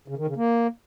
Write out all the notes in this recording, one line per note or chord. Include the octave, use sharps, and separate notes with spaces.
C#3
D#3
C#3
A#3